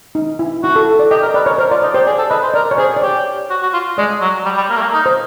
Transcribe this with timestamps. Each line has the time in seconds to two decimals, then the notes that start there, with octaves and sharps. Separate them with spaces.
0.15 D#4
0.39 E4
0.63 E4 F#4
0.76 A4
0.99 D5
1.11 G4 D#5
1.22 A#4 D#5
1.34 B4 D5
1.46 A#4 C#5
1.58 A#4 C5
1.71 F4 D5
1.82 D#4 D5
1.94 G4 C5
2.07 G#4 D5
2.18 A4
2.30 B4 D#5
2.43 C5
2.54 A#4 D5
2.71 C#5
2.78 G#4 C5
2.96 D5
3.02 G4 C#5
3.50 F#4
3.62 F#4
3.73 F4
3.98 G#3 D5
4.21 F#3
4.45 G3
4.57 G3
4.70 A#3
4.77 A3
4.81 A#3
4.93 D#4
5.06 C5